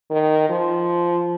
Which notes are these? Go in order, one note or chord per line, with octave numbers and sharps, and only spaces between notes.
D#3
F3